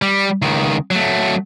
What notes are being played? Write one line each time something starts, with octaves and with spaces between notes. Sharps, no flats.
G3
C#2 D#3
F#3 A3